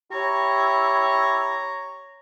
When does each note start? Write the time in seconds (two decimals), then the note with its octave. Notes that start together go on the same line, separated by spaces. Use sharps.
0.12 E4 G4 C#5 A#5